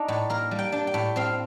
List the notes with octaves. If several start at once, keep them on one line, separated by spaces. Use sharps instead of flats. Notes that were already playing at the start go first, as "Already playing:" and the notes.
Already playing: D4 D#4
A2
A#3 A#4
G3
G5
D4
G5
A2
C4 F5